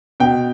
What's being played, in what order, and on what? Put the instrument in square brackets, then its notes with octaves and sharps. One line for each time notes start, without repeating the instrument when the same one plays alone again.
[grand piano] B2 G5